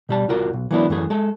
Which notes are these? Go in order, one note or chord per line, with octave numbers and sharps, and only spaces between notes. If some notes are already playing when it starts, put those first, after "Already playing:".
B2 G3 A5
C2 F4 F#4 A#4
B1
E3 F#3 A#3 B3 D4 E4
F#2 E3 A3 G#4
G#3 A4